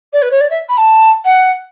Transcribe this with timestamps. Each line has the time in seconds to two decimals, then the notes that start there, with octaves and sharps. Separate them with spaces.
0.13 D5
0.22 B4
0.31 C#5
0.40 D5
0.50 E5
0.68 B5
0.77 A5
1.24 F#5